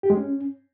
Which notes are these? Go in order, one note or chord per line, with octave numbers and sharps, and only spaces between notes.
G4
G#3
C#4